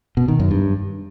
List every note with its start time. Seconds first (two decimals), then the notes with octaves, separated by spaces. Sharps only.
0.17 B2
0.28 D#3
0.40 F#2
0.51 G2